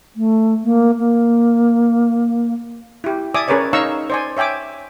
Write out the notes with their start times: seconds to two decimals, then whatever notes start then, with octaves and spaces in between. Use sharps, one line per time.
0.16 A3
0.64 A#3
0.99 A#3
3.04 E4 G4
3.34 D5 E5 G#5 D6 D#6
3.48 C#4 G#4 A#4 B4 C#5 D5
3.73 D#4 C#5 F5 A#5 C#6 E6
4.10 C5 D5 G#5
4.37 C#5 E5 G5 G#5 D6